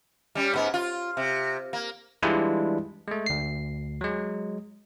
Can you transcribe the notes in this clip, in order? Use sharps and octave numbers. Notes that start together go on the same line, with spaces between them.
G3 C#4
G#2 B3
F4
C3
A#3
E3 G3 G#3 D4 E4 F4
G#3 A3
D2 C7
F#3 G#3